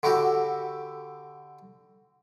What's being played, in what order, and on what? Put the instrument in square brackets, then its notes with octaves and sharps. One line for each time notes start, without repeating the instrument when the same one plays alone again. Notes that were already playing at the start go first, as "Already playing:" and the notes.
[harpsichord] D3 E4 F#4 G4